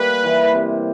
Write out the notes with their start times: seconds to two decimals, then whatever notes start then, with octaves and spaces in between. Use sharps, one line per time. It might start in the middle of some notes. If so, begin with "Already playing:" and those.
Already playing: G3 A#3 B4
0.24 E3
0.54 C3